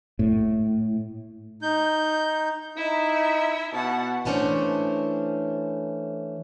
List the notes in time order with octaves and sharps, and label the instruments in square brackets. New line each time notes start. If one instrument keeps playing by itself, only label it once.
[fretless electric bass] A2
[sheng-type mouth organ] D#4 G6
[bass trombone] D#4 [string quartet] E4 E5
[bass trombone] B2 [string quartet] F#5 A5
[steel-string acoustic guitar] E3 A3 C#4 D4 C5